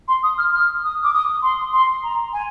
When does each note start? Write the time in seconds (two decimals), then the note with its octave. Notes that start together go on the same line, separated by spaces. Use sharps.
0.08 C6
0.23 D#6
0.38 F6
0.53 F6
0.84 D#6
1.04 D6
1.14 D#6
1.43 C6
1.73 C6
2.03 A#5
2.33 G#5